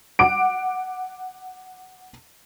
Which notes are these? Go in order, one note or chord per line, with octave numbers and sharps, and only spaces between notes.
F#5 D6 D7